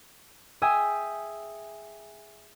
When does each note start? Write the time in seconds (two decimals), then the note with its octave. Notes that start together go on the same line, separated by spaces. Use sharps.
0.62 G#4 E5 G5 G#5 D#6 E6